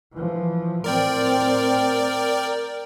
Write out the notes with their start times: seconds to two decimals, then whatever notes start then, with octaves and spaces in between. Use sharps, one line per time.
0.13 E3 F3
0.84 A2 C4 A#4 D5 G5